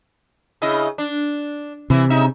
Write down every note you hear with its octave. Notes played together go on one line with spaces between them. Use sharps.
C#3 E4 D#5
D4
C3 E3 E4
C#3 D#4 E5